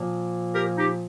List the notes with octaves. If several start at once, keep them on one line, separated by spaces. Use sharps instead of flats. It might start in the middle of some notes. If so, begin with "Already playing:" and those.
Already playing: A#2 F3 A#3
G4 A#4
D#4 G4